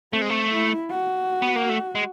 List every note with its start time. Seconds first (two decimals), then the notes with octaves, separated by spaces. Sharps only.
0.13 A3 C4
0.22 G#3
0.30 A3
0.51 E4
0.91 F#4
1.42 B3
1.56 A#3
1.69 A3
1.95 G#3